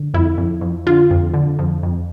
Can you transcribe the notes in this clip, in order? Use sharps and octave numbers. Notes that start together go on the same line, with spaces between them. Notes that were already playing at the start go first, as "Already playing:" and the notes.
Already playing: D3
F2 E4
F2
F2
D3 F4
F2
D3
F2
F2